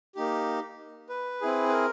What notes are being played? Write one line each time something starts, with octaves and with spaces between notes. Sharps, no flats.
A#3 D#4 G4
B4
C4 E4 G#4
B4
A#4